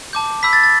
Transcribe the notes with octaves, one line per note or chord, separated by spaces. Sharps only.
A5 D6 G6
B5 E6 G6 B6
A6
A6